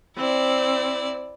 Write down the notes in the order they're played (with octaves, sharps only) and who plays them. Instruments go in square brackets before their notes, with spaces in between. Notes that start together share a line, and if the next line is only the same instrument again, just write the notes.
[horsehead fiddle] C4 [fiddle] E4 D5